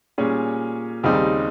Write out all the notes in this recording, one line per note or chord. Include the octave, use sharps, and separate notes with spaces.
A#2 G3 C#4 G#4
D#2 C#3 G3 C4 D#4